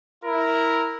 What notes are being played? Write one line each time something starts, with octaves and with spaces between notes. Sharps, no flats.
E4 A#4